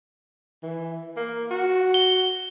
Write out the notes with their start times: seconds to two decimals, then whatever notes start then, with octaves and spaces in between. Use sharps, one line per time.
0.63 E3
1.17 A#3
1.51 F#4
1.94 G7